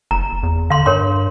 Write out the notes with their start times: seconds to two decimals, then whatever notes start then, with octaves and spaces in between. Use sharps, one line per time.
0.11 F#1 A#5
0.43 E2
0.70 D3 F5 C6
0.86 G2 A#4 C#5 C6